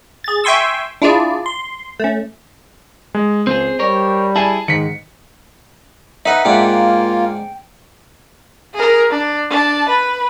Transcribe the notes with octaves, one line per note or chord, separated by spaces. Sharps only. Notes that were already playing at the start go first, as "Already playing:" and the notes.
G#4 A6
E5 G5 G#5 C6 C#6 E6
D4 E4 F4 G#4 D5
C6
A3 C#4
G#3
C#2 C4 G#4 C5
G3 A#4 C#5
E4 G#4 G#5 A5
G#2 D#3 B6 C#7
D#4 B4 E5 F#5
G#2 A#3 D4 F4 G5
G#4 A#4
D4
D4 A5
B4